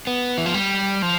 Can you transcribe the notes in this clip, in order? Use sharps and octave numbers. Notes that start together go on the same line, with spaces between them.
B3
E3
F3
G3
F3